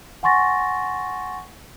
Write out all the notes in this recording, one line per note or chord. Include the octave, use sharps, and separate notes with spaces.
F#5 G#5 C6 C#6 A6 A#6